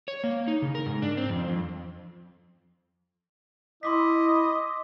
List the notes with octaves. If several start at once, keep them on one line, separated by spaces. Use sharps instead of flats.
C#5
A#3
D#4
C#3
A#4
G#2
D4
C4
F2
F2
E4 D#5 C6 D6 B6